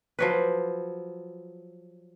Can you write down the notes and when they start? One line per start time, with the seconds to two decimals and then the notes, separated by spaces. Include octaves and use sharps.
0.19 F3 F#3 B4